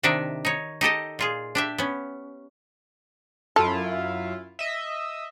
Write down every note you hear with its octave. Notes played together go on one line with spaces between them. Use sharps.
C3 D#3 D4 D#4 D5 E5
D#4 C#5
D#4 G4 A4 D#5
A#2 F4 G#4
D4 G4 E5
B3 C#4
F#2 E4 F4 A4
D#5 E5